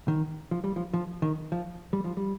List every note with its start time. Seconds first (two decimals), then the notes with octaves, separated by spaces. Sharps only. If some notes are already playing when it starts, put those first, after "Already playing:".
0.08 D#3
0.51 F3
0.64 G3
0.76 F3
0.94 F3
1.22 D#3
1.52 F3
1.93 G3
2.04 F3
2.17 G3